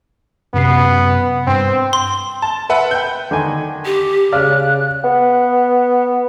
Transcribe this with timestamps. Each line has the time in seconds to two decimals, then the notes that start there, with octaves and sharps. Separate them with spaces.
0.54 F#2 C3 B3 C7
1.47 G2 C4
1.93 C6
2.42 A5
2.69 B4 E5 F#5
2.91 G5 G6
3.31 D3 D#3 G#5
3.85 G4
4.32 C#3 D5 F5 F6 F#6
5.04 B3